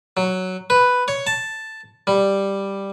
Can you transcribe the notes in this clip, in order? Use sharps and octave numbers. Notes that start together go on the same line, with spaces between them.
F#3
B4
C#5
A5
G3